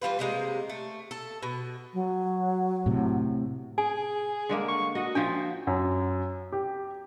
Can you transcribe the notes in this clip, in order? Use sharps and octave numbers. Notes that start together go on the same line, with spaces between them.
E3 G3 F4 B4
C3 G3 G#3 A#3
A3
A4
B2
F#3
A2 C3
G#4 G#5
D3 G#3 A#3
C#6
F#4 D#5
F3 D4 E5 G5
F#2
G4